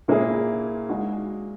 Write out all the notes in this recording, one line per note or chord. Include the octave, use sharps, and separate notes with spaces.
A#2 A#3 E4 G#4
G#3 D#4 F#4